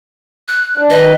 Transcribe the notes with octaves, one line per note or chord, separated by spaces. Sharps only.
F#6
D4
D#3 B4 D#5